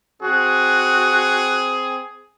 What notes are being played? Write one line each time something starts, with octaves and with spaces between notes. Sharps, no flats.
C4 F#4 G#4